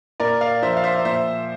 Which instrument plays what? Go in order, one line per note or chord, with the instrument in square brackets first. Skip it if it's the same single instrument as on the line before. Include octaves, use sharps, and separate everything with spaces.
[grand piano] A#2 A#4 D5
D5 F5
F3 C5 E5
F5
C5 E5
A#2 C5 E5